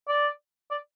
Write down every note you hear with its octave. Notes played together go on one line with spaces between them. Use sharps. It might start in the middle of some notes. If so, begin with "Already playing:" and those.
D5
D5